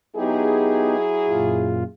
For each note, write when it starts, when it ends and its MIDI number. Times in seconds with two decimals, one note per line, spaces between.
0.16 1.92 54
0.16 0.96 59
0.16 0.96 63
0.16 1.92 64
0.16 0.96 67
0.16 1.92 68
1.29 1.84 42
1.29 1.84 46
1.29 1.84 65